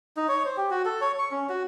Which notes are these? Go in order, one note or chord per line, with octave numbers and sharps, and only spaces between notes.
D#4
C#5
C5
G4
F#4
A4
C#5
C#6
C#4
F#4